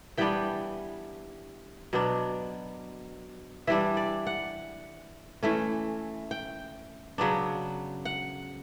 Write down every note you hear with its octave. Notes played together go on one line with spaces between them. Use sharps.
E3 G3 B3 D4 G5
B2 F#3 B3 D4
E3 G3 D4 E5
D5
F#5
E3 A3 C#4
G5
C#3 F#3 B3 D4
F#5